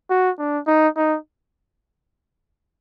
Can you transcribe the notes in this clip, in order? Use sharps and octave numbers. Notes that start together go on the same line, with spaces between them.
F#4
D4
D#4
D#4